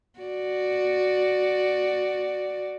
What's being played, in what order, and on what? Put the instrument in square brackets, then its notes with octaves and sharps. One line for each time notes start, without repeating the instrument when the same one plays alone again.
[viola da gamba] F#4 D5